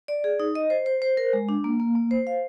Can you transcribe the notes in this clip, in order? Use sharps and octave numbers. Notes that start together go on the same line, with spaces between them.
D5
G#4
D#4
D#5
C5
C5
C5
A#4
G#3
D4
A#3
A#3
A#3
C5
F5